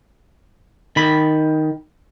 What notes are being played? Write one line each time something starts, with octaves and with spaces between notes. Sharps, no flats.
D#3 B5